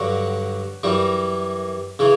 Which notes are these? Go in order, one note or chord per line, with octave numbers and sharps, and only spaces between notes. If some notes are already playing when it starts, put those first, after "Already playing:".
Already playing: G2 D3 F#3 F#5
F#2 E3 G3
C#3 E3